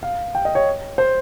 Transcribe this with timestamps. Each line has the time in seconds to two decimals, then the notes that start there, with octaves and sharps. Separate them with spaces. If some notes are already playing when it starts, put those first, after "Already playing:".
0.03 F5
0.35 G5
0.45 D#5
0.55 C#5
0.98 C5